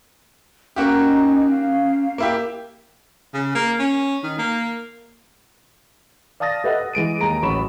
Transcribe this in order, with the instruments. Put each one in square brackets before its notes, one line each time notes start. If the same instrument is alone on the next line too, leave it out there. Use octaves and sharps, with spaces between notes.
[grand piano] A#3 F#4 G4 [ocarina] C#4 [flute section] D#4
[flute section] F5
[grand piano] A#3 E4 G4
[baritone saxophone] C#3
A#3
C#4
D#3
A#3
[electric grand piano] D5 F5 A5 D#6 A6 A#6
G4 A4 B4 D#5 E5 F#5
F#5
E3 G#3 D7 D#7
D#2 G#3 A#5 D7
A1 F#3 B5 C#6 E7